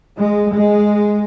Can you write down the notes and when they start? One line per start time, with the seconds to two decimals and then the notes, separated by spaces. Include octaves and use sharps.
0.17 G#3
0.50 G#3